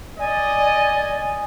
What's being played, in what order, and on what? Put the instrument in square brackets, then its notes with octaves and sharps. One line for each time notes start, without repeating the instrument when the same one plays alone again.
[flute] D5 [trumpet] D#5 [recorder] G#5